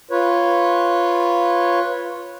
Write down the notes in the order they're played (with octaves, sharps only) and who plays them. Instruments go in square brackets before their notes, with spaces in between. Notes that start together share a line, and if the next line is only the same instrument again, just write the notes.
[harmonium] F4 B4 C#5